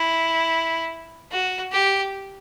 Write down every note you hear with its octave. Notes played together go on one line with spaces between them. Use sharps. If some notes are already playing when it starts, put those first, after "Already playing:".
Already playing: E4
F#4
G4